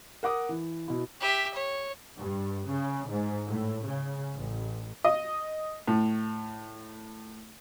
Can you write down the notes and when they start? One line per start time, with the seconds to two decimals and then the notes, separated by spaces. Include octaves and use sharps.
0.23 A#4 F#5 D6 D#6
0.49 E3
0.88 B2 E4
1.20 G4 E5
1.54 C#5
2.17 G2
2.67 C#3
3.08 G#2
3.47 A2
3.85 C#3
4.35 A1
5.04 D#5
5.88 A2